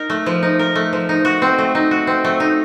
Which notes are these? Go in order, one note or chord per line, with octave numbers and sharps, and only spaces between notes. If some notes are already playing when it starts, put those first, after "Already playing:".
Already playing: D#4 A#4
A3
F3
D#4
A#4
A3
F3
D#4
F#4
C4
A3
D#4
F#4
C4
A3
D#4